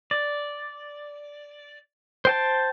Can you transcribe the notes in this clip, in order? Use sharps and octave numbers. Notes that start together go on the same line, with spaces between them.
D5
C5 G5 A5